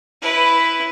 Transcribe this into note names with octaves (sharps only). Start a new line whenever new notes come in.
E4 B4